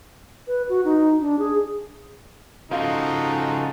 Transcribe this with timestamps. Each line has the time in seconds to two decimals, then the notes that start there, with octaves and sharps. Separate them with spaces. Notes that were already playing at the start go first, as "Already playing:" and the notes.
0.47 B4
0.69 F#4
0.85 D#4
1.20 D4
1.39 G#4
2.71 C#3 F3 D#4 F4 F#4 A4 F5